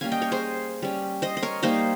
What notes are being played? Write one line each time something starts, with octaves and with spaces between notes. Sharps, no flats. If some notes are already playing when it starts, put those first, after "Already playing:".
G3 A#3 C#4 F5 G#5
D#5 G5
A#4 C#5
G#4 C5
G3 C#4
C5 D#5
D#5
A#4 C#5
G3 A#3 D#4 C5 D#5